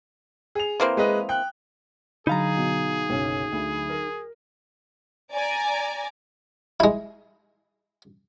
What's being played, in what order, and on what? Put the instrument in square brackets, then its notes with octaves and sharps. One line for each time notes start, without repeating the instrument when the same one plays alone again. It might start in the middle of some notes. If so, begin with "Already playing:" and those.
[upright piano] G#4 F7
[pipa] E3 A#3 C4
[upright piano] G#3 B4 D#5
G5 F#6
[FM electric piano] D3 F#3 [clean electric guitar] D#4 F5 A#5 [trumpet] G#4 [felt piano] B5 A6
[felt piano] B2
F#1 B1 C#4
D2
A#4
[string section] D5 G#5 A#5
[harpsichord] G#3 E4